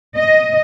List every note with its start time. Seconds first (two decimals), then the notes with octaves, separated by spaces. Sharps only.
0.16 D#5